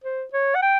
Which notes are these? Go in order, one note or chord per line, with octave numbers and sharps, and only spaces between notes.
C5
C#5
F#5
G5